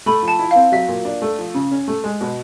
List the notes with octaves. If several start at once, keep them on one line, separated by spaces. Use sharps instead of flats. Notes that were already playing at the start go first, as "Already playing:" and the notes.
A3 B5
F3
A5
E4
F5
C4
F#3 E5
A#2
D4
A3
F3
C#3
C#4
A3
G#3
B2